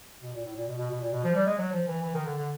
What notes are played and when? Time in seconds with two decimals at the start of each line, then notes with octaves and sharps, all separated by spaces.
0.22 B2
0.33 A#2
0.44 A2
0.56 A#2
0.68 B2
0.78 B2
0.90 B2
1.01 A#2
1.12 B2
1.24 F3
1.35 G3
1.46 G#3
1.58 F#3
1.73 F3
1.88 E3
2.02 E3
2.14 D#3
2.25 D3
2.37 D3